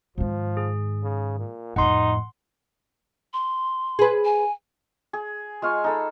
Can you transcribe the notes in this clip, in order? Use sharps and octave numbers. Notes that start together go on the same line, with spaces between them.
G#2 D#3 F3
G#4
C#3
A#2
F2 A2 D#4 F#5 C6
C6
G#4 B4
G#5
G#4
G#3 F4 F5 C#6
D#4 A4 B5